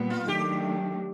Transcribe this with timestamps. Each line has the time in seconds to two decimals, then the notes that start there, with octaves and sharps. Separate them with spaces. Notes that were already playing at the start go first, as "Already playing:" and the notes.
Already playing: A#2 G3 B3
0.10 F4
0.28 D#3 F#3 A3 D4 G4